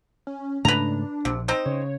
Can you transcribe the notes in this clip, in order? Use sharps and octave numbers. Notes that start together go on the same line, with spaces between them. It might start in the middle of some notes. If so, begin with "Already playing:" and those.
C#4
G#2 C#3 A3 D4 B4 A#5
A#1 C3
C4 D#4 C5
C#3 C#5